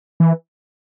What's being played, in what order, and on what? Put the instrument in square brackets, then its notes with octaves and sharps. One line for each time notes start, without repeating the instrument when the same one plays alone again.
[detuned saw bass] E3